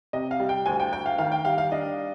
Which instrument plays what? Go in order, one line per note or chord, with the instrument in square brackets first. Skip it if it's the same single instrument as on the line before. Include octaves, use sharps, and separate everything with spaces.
[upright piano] C3 D#5
F5
G3
G5
D2 G#5
G5
D2 G5
F5
D#3 F5
G5
G3 F5
F5
D4 D#5